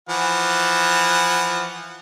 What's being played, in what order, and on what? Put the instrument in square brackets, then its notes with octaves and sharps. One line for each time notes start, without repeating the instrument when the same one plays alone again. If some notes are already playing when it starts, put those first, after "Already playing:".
[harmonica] E3 F3 F#5